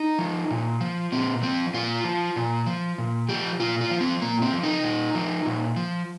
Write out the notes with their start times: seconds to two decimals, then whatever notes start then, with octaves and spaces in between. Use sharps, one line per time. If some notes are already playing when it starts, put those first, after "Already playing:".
Already playing: D#4
0.19 F3
0.51 A#2
0.81 F3
1.12 A#2 C4
1.42 F3 C4
1.74 A#2 F4
2.04 F3
2.36 A#2
2.66 F3
2.98 A#2
3.29 F3 G4
3.60 A#2 F4
3.81 F4
3.91 F3
4.01 C4
4.22 A#2 A#3
4.42 C4
4.52 F3
4.63 D#4
4.84 A#2
5.15 F3
5.46 A#2
5.77 F3